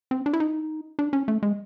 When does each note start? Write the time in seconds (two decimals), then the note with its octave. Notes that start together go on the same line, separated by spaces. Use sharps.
0.11 C4
0.26 D4
0.33 E4
0.40 D#4
0.99 D4
1.13 C#4
1.28 A3
1.43 G#3